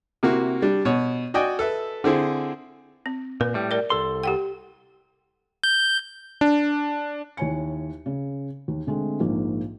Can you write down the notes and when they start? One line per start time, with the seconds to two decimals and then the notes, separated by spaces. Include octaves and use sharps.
0.23 C3 A#3 E4 F#4
0.62 G3 D4
0.85 B2 C#5
1.34 F#4 D5 D#5 G5 G#5
1.59 A4 B4 E5
2.04 D3 C4 E4 G#4
3.06 C4
3.41 A#2 B4
3.54 A2 G3
3.71 A#4 D5
3.90 C2 A4 C6
4.23 G4 F#5 G5
5.64 G6
6.41 D4
7.37 D#2 E4 C#5 G#5 C#7
8.06 C#3
8.68 D#2
8.87 D3 G#3 A3 C4
9.20 A#1 G#2 A#3